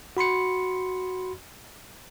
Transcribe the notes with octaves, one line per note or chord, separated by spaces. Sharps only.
F#4 B5 C6 C#7